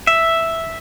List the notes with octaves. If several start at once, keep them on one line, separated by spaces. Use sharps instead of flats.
E5